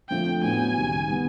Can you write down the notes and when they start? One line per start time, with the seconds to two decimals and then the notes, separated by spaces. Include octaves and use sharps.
0.09 F2 D3 F3 A3 G5
0.42 A2 F#3 B3 G#5
0.75 C#2 C3 D#3 G3
1.08 D#3 G3 B3